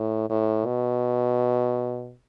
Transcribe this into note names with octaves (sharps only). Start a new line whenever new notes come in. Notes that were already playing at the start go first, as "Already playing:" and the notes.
Already playing: A2
A2
B2